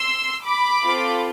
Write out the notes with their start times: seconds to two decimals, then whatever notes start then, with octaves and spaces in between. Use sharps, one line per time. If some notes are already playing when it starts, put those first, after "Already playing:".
Already playing: C6 E6
0.45 B5 D6
0.82 C4 F4 A4